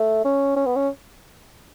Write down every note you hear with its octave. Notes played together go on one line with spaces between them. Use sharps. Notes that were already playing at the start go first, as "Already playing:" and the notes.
Already playing: A3
C#4
C#4
B3
C#4